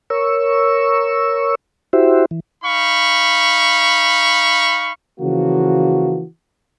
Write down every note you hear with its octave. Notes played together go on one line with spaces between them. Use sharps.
A#4 C#5 C#6 E6
E4 F#4 G4 C5 E5
E3
D#4 F5 B5 C#6
C#3 E3 F3 A#3 F#4